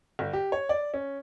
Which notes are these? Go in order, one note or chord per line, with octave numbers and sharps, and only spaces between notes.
G1
G4
C#5
D5
C#4